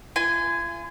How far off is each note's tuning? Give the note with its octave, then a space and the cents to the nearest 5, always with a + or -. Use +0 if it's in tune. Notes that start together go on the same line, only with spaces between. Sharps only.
F4 -45 G#5 +0